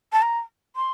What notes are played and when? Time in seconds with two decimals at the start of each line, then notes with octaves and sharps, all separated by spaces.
0.13 A5
0.22 A#5
0.76 C6